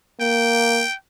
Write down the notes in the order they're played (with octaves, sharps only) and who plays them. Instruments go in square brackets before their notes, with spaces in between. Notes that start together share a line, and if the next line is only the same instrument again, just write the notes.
[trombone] A#3 [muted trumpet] G5